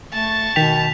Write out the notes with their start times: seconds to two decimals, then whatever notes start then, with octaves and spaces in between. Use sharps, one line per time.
0.13 A3 A5 C#6
0.56 B2 D#3 G5 B6 F7